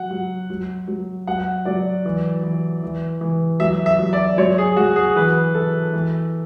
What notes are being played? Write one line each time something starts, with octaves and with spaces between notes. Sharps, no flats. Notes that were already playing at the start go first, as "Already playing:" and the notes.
Already playing: F#3 F#5
F#3
F#3
F#3
F#3 F#5
F#3 D5
E3
E3
E3
E3
F#3 E5
E5
F#3
D5
F#3 C#5
G#4
F#3 F#4
G#4
E3 B4
E3 A4
E3